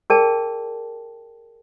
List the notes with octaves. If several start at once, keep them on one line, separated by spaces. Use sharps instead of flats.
G#4 A#4 D5 G5 A5